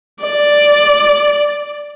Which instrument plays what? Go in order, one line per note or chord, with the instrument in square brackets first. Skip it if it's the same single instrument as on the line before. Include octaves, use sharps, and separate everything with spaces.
[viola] D5